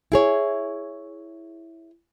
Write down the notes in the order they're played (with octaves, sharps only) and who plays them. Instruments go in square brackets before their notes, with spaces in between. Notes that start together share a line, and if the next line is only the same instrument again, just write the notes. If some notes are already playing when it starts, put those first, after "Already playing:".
[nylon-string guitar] E4 G#4 C#5